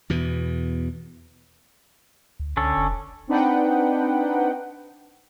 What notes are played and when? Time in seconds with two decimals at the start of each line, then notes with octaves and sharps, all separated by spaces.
0.10 E2 B2 E3
2.40 D2
2.57 C#2 D3 C#4 A4
2.77 F1
3.27 C4 D4 D#4 B4 F#5 G5